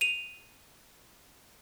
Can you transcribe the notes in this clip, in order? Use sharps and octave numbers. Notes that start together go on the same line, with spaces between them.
D#7 F7